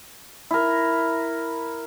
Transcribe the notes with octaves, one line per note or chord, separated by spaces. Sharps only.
E4 A#4